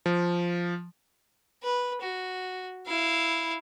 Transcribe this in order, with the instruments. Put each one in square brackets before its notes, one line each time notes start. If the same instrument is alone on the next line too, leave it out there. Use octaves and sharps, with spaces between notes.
[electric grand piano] F3
[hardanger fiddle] B4
F#4
E4 F5